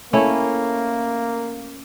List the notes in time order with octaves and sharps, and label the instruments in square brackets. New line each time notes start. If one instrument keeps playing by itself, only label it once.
[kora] A3 C#4 E4 [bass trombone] A#3